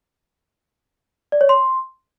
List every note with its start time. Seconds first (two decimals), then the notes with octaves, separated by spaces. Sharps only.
1.32 D5
1.41 C#5
1.49 C6